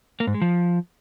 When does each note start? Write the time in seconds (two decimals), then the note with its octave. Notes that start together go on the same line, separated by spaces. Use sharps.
0.20 A#3
0.27 G#2
0.34 G#3
0.42 F3